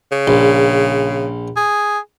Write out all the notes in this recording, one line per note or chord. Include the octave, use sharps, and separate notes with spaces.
C#3
A#1
G#4